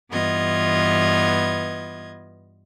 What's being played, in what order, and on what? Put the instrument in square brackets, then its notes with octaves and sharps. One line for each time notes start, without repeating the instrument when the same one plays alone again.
[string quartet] G2 E3 B3 F4 D#5 G#6